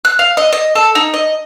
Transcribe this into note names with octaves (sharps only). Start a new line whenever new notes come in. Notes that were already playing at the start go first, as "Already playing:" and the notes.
F#6
F5
D#5
D#5
A4
D#4
D#5